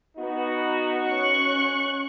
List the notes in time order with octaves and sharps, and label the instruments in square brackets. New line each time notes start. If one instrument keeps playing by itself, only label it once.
[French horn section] B3 D#4 F#4
[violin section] C#4 C#6 F#6